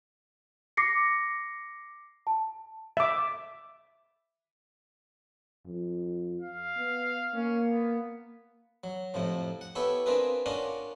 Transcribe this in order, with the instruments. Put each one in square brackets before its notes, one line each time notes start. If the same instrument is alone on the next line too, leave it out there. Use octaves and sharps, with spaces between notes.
[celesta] D6 A#6 C7 C#7
A5
[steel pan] E5 D6
[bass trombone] F2
[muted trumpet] F5
[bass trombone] B3
[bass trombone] A#3 [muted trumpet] C#4
[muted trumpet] B3
[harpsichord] F#3
F2 A2 C3 F3
F#5
B3 E4 G4 A4 C#5
C4 D4 F4 G#4 A#4 B4
C#4 D4 F4 F#4 A#4 D5